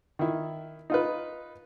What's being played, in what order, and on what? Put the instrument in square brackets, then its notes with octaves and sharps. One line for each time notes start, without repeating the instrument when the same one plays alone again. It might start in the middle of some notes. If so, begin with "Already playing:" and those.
[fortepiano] D#3 E4
D#4 F4 B4